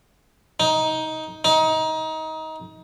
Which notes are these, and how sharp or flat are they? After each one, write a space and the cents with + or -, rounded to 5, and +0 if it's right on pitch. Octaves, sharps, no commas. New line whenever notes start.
D#4 +15
D#4 +25